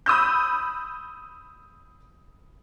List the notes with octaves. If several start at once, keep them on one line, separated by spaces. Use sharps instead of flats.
B5 D#6 E6 G6